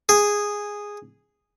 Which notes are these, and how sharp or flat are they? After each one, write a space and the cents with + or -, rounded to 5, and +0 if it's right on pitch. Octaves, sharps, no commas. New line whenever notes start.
G#4 -10